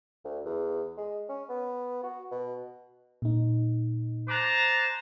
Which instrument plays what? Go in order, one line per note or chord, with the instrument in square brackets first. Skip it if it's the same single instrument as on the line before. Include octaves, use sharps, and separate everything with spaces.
[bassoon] D2
E2
G#3
C#4
B3
F#4
B2
[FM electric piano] A#2 D#4
[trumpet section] C5 A5 A#5 [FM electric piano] D6 F#6